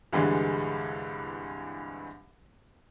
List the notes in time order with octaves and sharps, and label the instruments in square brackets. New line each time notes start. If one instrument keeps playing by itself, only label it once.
[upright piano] C2 G2 D3 E3 G3 G#3